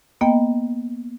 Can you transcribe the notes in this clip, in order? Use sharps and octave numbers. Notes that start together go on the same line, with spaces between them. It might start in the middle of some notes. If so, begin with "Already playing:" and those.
A#3 B3 D#5 G5